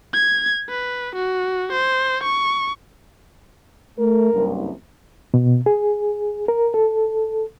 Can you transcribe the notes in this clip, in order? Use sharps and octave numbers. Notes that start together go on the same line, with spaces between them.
G#6
B4
F#4
C5
C#6
A3 A#4
F#1 C2 G2
B2
G#4
A#4
A4